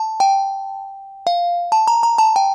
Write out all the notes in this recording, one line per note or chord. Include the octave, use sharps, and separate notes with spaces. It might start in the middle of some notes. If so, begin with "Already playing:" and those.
Already playing: A5
G5
F5
A5
A#5
A#5
A5
G5